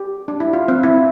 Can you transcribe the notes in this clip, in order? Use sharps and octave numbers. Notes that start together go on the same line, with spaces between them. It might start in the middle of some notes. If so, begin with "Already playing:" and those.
Already playing: G4
D4
E4
F4
C4
E4